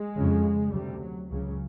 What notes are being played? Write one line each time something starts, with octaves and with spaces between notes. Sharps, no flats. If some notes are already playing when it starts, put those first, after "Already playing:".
Already playing: G#3
F2 C#3
D2 C3 G3
F#3
C#2 C#3 F#3